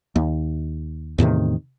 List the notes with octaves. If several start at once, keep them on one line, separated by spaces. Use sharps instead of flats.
D#2
E2 A2 C3 D#3